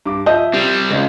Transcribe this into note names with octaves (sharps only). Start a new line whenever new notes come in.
G2 D6
F3 D#5 E5 G6
C3 G3 C4
C#2 G#3